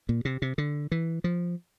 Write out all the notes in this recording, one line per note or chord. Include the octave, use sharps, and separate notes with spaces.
A#2
C3
C3
D3
E3
F3